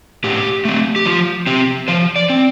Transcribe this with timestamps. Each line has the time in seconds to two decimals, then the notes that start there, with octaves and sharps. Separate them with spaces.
0.24 A2 G4
0.65 A3 C4
0.96 G4
1.05 F3 F4
1.47 C4 G4
1.88 F3 C5
2.16 D5
2.30 C4